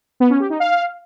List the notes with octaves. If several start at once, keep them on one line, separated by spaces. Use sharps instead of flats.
B3
C#4
G4
D#4
F5